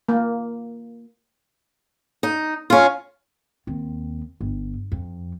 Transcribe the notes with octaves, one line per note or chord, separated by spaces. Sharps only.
A#3
D#4
C#4 F4
D#2 C4
G1
F2